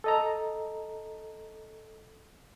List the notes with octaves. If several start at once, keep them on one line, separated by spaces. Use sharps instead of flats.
A4 D#5 A#5